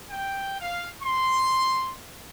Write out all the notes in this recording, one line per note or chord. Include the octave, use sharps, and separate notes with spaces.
G5
F5
C6